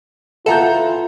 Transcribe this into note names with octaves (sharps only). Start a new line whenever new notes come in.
E3 F4 A4 F#5 A#5 G6